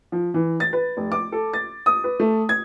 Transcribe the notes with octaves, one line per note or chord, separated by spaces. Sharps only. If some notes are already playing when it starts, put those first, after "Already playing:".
F3
E3
A6
B4
F1
D6
A4
A6
D#6
B4
A3
G#6